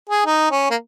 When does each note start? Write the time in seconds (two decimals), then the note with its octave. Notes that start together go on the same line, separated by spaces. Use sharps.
0.10 G#4
0.26 D#4
0.51 C#4
0.70 A#3